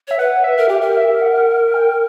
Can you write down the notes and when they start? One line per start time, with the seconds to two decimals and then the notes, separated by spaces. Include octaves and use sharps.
0.08 C#5 E5
0.19 B4 F#5
0.44 E5
0.57 A#4
0.69 G4 G5
0.81 A#4
0.97 E5
1.22 F#5
1.74 G5